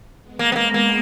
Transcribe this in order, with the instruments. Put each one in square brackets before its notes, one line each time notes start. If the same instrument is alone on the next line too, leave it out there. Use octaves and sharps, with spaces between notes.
[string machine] G#3 B3
[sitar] A#3
B3
A#3
A#3